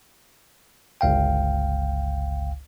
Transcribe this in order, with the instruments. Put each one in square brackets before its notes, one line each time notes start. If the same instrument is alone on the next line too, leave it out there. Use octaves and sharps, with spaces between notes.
[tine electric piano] G1 C#2 F5 G5